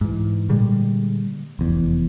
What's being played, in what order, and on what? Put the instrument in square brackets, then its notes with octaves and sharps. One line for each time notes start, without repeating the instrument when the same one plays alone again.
[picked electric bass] G#2 E3
A#2 D3 G3 G#3
F1 E2